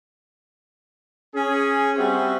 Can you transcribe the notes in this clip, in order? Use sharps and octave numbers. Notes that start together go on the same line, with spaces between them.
C#4 G#4
G3 C4 F#4 C5 E5